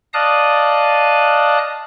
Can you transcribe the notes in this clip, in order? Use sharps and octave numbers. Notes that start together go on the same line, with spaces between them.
D5 D#5 F5 A5 D#6 F#6